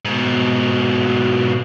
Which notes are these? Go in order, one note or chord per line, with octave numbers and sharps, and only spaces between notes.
G#2 B2